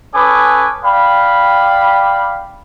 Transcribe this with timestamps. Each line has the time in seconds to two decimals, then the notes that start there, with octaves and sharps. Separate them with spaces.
0.14 C#4 A4 B4 G#5 D6 D#6
0.85 D5 F5 G5 B5